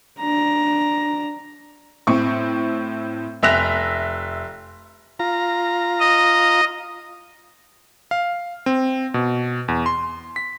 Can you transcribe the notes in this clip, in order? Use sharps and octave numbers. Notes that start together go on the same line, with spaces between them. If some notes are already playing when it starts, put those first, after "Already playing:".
D4 A#5
A2 C4 C#6
F1 E5 F#6 A#6 F7
F4 A#5
D#5
F5
C4
B2
E2
C6
B6